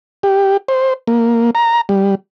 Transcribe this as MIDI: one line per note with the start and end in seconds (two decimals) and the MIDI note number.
0.23 0.57 67
0.68 0.94 72
1.07 1.50 58
1.55 1.81 82
1.89 2.15 55